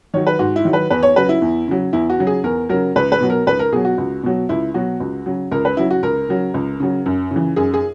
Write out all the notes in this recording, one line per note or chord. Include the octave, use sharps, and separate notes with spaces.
D#3 F#3 C#5
B4
G#2 F#4
E4
D#3 F#3
B4
E2 B4
C#5
C#3 F#3 B4
E4
E2
C#3 F#3
E2 E4
F#4
C#3 F#3
G#4
E2 A#4
C#3 F#3 A#4
C#2 B4
B4
B2 F#3
A#4
C#2 B4
A#4
B2 F#3 G#4
F#4
C#2
B2 F#3
C#2 E4
B2 F#3 F#4
C#2
C#3 F#3
C#2 A#4
B4
C#3 F#3 E4
F#4
C#2 A#4
C#3 F#3
C#2
C#3 F#3
F#2
C#3
E3
F#2 G#4
G#4